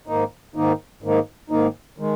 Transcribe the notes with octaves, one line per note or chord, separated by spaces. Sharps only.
G#2 D#3 A#3 D#4
G#2 D#3 A#3 D#4
G#2 D#3 A#3 D#4
G#2 D#3 A#3 D#4
D#3 G#3